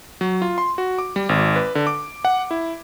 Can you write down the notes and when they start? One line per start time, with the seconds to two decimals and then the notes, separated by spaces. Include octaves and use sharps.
0.21 F#3
0.42 F4
0.58 C6
0.78 F#4
0.98 D6
1.16 G3
1.29 G#1
1.56 B4
1.75 D3
1.87 D6
2.25 F#5
2.51 E4